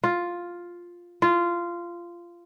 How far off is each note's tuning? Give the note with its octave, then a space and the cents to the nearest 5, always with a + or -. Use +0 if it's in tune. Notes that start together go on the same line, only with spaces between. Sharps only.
F4 +5
F4 -15